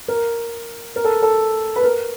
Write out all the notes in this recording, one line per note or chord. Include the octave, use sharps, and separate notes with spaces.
A#4
A#4
A4
A4
B4
A#4